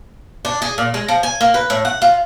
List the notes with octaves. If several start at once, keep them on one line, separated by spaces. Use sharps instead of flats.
D4
G#4
A#2
G#3
F3
G#5
A#3
B4
A2
F#5
F4